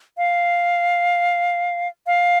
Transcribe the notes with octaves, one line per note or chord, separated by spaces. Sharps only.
F5
F5